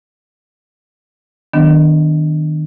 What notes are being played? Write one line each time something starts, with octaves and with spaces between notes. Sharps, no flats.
D#3 F#3 B3 D4